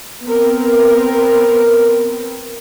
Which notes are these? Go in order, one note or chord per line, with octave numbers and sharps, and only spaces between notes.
B3 C4 A#4